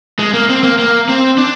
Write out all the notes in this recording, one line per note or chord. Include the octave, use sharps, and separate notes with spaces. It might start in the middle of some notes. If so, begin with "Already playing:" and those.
G#3
A#3
C4
A#3
A#3
C4
D4